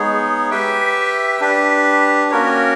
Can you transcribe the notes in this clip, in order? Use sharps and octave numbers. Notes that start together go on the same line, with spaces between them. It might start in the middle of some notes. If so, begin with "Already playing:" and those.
Already playing: G#3 B3 D#4 G#4 C#5
G4 B4 E5 G5
D4 G4 B4
A#3 C#4 F#4 A#4 C#5